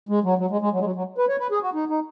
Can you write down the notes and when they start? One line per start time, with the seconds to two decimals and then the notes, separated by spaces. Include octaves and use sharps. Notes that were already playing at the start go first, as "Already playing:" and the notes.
0.09 G#3
0.24 F#3
0.38 F#3
0.51 G#3
0.61 G#3
0.72 F#3
0.80 G#3
0.84 F#3
0.95 F#3
1.18 B4
1.28 C#5
1.39 B4
1.51 G#4
1.62 F#4
1.74 D#4
1.89 D#4